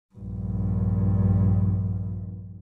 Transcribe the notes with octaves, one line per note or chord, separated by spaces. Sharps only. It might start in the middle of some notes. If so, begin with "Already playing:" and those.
A#1 G2